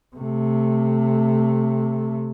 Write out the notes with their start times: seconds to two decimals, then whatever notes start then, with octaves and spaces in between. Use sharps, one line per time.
0.16 C3 A3